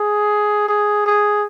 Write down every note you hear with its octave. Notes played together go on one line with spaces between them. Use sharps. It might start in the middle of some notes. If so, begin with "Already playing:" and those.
Already playing: G#4
G#4
G#4